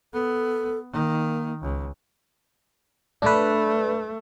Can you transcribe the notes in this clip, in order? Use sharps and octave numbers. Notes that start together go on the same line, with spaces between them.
B3 A4
D#3 A#3
C#2
A3 D4 B4